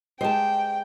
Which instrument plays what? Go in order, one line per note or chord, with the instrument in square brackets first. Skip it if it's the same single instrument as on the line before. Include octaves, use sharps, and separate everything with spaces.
[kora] G#3 G4 [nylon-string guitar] C5 A5 [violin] G5